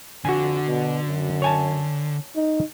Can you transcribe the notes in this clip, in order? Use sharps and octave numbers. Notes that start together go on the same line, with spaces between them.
F2 D3 F#4 G#5
B2
F#2
C#5 G#5 A5
D#4